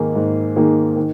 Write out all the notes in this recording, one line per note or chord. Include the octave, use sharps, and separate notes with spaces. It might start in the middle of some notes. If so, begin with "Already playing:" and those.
Already playing: G#2 D#3 A#3 D#4 G#4
G#2
D#3 A#3 D#4 G#4
D#3